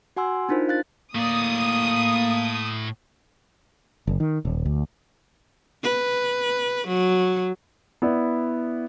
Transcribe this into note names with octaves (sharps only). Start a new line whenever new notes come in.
F#4 F#5 G#5 C6 E6
D4 D#4 F4 A#4 C5
F5 F#6 A6
A2 A#3 D5 D#6
F#1
D#3
D#1
D2
B4
F#3
B3 E4 D5